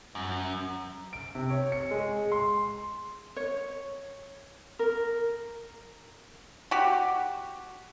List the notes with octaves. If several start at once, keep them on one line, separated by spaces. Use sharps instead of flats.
F#2
D7
C3
C#5
C#7
G#3
C6
C#5
A#4
F#4 G4